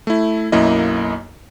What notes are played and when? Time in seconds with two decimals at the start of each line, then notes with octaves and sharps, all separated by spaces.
0.07 A3 E4
0.52 B1 F#2 A#3 E4 D#5